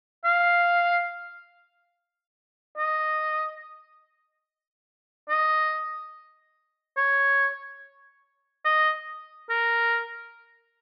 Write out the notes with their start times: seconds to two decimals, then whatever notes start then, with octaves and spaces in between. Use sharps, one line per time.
0.24 F5
2.77 D#5
5.29 D#5
6.97 C#5
8.65 D#5
9.49 A#4